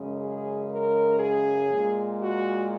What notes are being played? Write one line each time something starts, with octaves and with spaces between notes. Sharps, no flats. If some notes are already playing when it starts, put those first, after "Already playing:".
Already playing: F#2 C#3 G#3
G#4
A#4
G#4
A#2 G#3
F#4